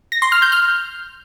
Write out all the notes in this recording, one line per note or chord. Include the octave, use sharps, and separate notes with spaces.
A#6
C6
F6
G6
F6